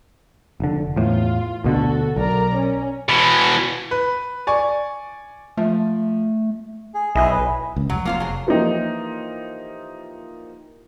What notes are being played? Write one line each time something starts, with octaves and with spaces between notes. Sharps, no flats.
F1 D3
E2 A2 F4
D2 B2 D3 F#4 A4
B1 A#4 D5 A#5
C#4
B2 E3
B4
D5 G#5 C#6
F3 A3
G#4
B1 E4 G#4 D#5
B4
C#2
F1 F#3
A#3 F4 C5
F#3 G#4
E3 F3 A#3 D#4 G4